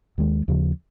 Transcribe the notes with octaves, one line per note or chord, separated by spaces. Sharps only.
D#2 D#3 G#3
D#2 C#3 F3